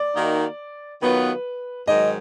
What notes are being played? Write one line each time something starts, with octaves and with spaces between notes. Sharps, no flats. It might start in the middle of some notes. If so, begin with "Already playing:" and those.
Already playing: D5
D#3 A#3 D#4 F#4
D#3 F#3 B3 F4 B4
G#2 D#3 F#3 D#5